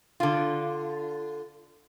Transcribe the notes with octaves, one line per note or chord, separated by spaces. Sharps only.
D3 F4